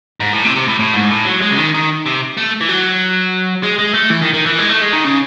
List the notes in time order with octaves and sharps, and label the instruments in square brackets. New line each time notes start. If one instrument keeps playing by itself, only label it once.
[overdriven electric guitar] G#2
A2
C3
C3
A2
A2
G#2
A2
F#3
G#3
C#3
D#3
D#3
C3
A3
E3
F#3
G#3
G#3
A3
E3
D#3
D#3
E3
G#3
A3
G#3
D#3
C#3